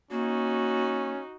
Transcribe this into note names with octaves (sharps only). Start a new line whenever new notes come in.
A#3 C#4 D#4 F#4